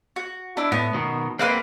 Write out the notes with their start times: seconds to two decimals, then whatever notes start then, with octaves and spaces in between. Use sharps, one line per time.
0.16 F#4
0.57 D4 E4
0.72 A2 B3
0.94 B2 D#3
1.39 A#3 C4 B4 F5 F#5